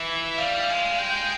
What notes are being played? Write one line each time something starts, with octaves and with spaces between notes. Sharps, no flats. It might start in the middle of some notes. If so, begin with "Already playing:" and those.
Already playing: E3 E5
G3 F5
G#3
G5